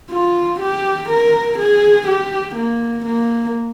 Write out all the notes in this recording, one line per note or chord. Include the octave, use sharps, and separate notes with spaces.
F4
G4
A#4
G#4
G4
A#3
A#3